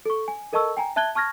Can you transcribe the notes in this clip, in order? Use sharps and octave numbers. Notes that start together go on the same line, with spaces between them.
A4 C#6
G#5
A4 A#4 D#5 A5 C#6 E6
G5 G#5 A#5
E5 A5 F#6 G#6 G7
A5 C#6 F6 G#6 A#6